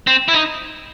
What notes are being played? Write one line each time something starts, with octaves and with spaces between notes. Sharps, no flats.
C4
E4
D#4